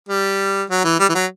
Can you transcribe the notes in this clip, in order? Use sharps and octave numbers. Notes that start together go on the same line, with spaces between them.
G3
F#3
E3
G3
E3
F#3